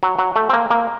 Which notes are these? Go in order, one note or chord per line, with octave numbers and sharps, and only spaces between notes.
F#3
F#3
A3
C4
A#3
A#3